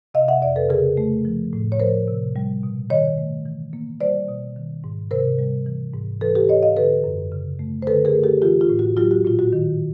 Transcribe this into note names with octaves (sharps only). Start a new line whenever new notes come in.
C3 D#5 F5
E5 F#5
F2 D5 E5
A4 B4
C#3 G#4 A#4
A3
F3
A2
C#5
F3 A#4 C5
C3
G3
B2
D#3 C#5 D#5
A3
E3
A#3
G3 C5 D5
B2
D#3
G#2
C3 A#4 C5
G3
E3
G#2
E3 A4 B4
G4 A4
G#2 C#5 D#5
D#5 F5
D3 A4 B4
F#2
C#3
A3
C5
D3 A4 B4
G#4 A#4
A3
G4 A4
E3 F4 G4
F4
A2
F#4
F#3 F4 G4
F#4
A#2 F4
F#4
D#3